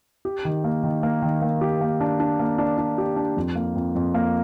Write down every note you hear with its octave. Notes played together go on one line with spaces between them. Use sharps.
G4
D#3
A#3
D#3
A#3
D#3
A#3
G4
A#3
D4
D4
A#3
D4
D4
G4
D4
F2
A#3
F2
F2
A#3